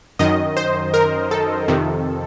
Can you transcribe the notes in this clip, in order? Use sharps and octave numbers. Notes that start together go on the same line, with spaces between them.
F#2 D#3 D#5
C5
A#4
A4
F2 C3 D#3